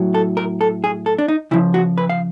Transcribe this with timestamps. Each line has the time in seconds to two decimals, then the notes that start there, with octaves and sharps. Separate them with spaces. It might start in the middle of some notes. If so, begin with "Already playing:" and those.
Already playing: A2 F#3
0.15 A4
0.37 A#4
0.61 A4
0.84 G#4
1.06 A4
1.18 D4
1.28 D#4
1.51 C#3 F3 E4
1.74 F#4
1.98 B4
2.09 F5